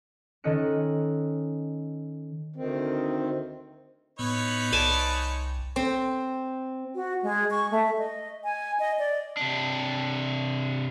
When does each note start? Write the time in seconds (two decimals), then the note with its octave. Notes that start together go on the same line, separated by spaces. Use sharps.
0.44 D#3 C#4 A4 D#5 F#6 C#7
2.56 D2 D#3 C4
4.19 A2 B3 D#4 B4 C#5
4.72 C2 D5 G#5 A5
5.76 C4
6.95 F#4
7.23 G#3
7.51 C#6
7.71 A3
7.98 D#5
8.44 G#5
8.79 D#5
8.99 D5
9.37 C3 D4